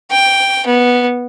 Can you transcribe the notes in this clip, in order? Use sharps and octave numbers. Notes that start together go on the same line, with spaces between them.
G5
B3